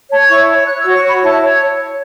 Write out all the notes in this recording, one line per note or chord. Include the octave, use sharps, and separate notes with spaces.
C#5 A5
E4 C#6
C#5
C#5 F#6
E6
F#4
C#6
C#5 B5
E4 A5
C#5